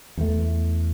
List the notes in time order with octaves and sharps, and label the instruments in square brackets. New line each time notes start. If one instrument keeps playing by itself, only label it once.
[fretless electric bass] E2 A3